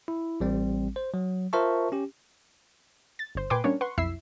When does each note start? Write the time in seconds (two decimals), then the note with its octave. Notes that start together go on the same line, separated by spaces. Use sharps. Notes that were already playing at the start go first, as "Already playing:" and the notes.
0.08 E4
0.40 A1 G3 C4
0.96 C5
1.14 F#3
1.53 F4 A#4 C5 E5 A5 C#6
1.92 C#4 G4
3.19 A6
3.35 G1 C5
3.50 A#2 B4 G5 G#5 C6 D6
3.64 G3 A#3 C#4 D4 C#5
3.81 B4 F#5 C6 C#6
3.98 B1 F2 E4 E5 E6 C7